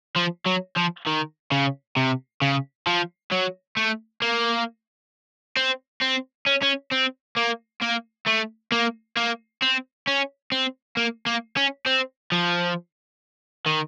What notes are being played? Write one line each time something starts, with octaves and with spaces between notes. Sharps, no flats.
F3
F#3
F3
D#3
C#3
C3
C#3
F3
F#3
A3
A#3
C4
C4
C#4
C#4
C4
A#3
A#3
A3
A#3
A#3
C4
C#4
C4
A#3
A#3
C#4
C4
F3
D#3